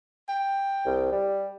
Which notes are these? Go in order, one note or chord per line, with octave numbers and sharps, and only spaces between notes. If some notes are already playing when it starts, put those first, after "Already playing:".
G5
C2
G3